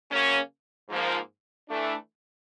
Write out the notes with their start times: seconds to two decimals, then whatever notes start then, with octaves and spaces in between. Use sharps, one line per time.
0.11 C#3 F#3 A#3 C#4
0.90 G#2 F3 A#3
1.68 E3 A3 D4